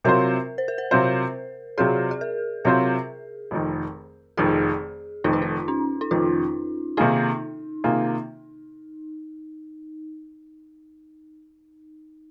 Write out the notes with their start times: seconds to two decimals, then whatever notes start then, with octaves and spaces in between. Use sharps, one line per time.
0.04 C3 F#3 C4 F4 A#4 C5
0.58 C5
0.68 A#4
0.78 C5
0.91 C3 F#3 C4 F4 A#4 C5
1.78 C3 F#3 C4 F4 G#4 C5
2.11 G#4
2.21 A#4
2.65 C3 F#3 C4 F4 A#4 C5
3.51 F1 F2 D#3
4.37 F1 F2 D#3 G#4
5.24 F1 F2 D#3 D#4
5.33 F4
5.42 D#4
5.68 C#4
6.01 D#4
6.11 F1 F2 D#3 F4
6.97 C3 D#3 A#3 D#4 F4 G#4
7.84 C3 D#3 A#3 F4 G#4